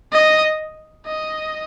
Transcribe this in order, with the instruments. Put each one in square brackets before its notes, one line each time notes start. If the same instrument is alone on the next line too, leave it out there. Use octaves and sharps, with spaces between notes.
[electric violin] D#5
D#5